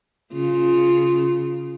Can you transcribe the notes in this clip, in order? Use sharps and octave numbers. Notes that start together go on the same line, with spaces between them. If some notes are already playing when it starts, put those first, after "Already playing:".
C#3 F4